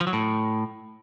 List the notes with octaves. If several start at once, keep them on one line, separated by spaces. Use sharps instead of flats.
F3
F#3
A2